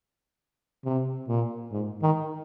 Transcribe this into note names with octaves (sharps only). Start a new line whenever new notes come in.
C3
A#2
G#2
D#3